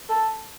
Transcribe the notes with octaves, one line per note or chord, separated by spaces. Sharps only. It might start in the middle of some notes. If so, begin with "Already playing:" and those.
A4